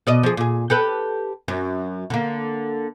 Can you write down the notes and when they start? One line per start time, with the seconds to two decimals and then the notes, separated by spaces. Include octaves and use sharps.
0.07 B2 D5 D#5
0.23 F3 G#4
0.37 A#2 G#4
0.70 G4 A4 B4
1.48 F#2
2.10 D3 A#3